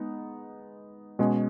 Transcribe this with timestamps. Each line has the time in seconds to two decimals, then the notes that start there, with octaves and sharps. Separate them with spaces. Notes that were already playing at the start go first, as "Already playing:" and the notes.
Already playing: G#3 B3 D#4
1.19 B2 G#3 C#4 G#4